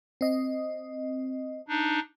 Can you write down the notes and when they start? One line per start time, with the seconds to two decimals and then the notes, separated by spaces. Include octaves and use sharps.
0.21 C4 D#5
1.68 D4 D#4